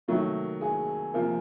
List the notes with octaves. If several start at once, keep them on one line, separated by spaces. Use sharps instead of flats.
C3 D#3 F#3 A3
G#4
C3 F3 A#3